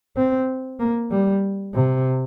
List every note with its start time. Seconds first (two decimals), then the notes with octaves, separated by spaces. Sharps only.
0.16 C4
0.79 A#3
1.11 G3
1.74 C3